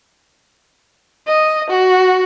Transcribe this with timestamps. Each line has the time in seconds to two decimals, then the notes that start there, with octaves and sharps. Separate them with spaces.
1.28 D#5
1.70 F#4